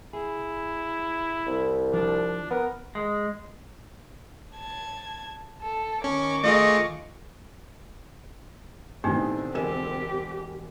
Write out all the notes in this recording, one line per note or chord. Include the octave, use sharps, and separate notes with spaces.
E4 G#4
C2
F3 D4
B3 A#4
G#3
A5 G#6
A4
D#3 C#4 C#6 D6
A3 F4 G#4 D#5
A1 B2 D3 D#3 C4 D4 D#4 G4
E1 G4 A#4 G#5 E7